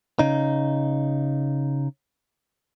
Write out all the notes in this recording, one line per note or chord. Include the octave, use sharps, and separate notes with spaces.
C#3 D#4